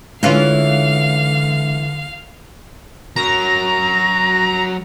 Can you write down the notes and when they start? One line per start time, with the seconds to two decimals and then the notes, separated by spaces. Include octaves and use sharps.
0.23 D3 E3 G#3 C#4 D4 F4 F5
3.16 F#3 A#4 A#5